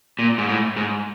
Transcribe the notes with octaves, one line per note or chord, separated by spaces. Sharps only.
A#2
G#2
A2
G#2